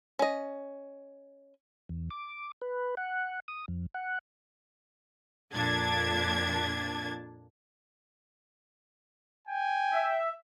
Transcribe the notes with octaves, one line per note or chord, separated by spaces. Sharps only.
C#4 D#5
E2
D6
B4
F#5
D#6
F2
F#5
F2 A#2 D4 G#6 A6
G5 G#5
E5